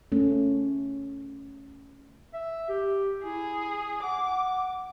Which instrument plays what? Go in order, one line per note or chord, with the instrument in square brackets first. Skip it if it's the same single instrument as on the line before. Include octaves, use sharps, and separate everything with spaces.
[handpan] A3 C#4
[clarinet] E5
G4
[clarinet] E4 [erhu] G#4
[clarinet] F#5 [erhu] D6